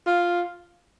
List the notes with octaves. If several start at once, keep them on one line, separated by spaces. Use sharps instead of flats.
F4